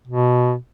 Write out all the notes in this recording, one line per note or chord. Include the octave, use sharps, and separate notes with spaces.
B2